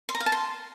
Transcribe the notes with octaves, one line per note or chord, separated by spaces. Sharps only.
C6
A#5
F5
A5
C6